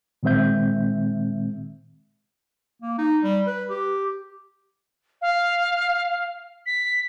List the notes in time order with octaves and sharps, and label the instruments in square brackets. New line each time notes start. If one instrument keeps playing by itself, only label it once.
[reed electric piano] A#2 D#3 G#3 C4 E5 G6
[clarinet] A#3
D#4
G3
B4
G4
[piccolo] F5
B6